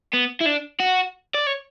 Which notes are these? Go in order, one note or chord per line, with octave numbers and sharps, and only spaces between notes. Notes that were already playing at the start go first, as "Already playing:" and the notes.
B3
E4
D4
F#4
D5
C#5